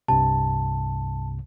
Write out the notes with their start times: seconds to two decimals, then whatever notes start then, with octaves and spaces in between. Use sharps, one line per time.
0.08 C2 G2 C3 A5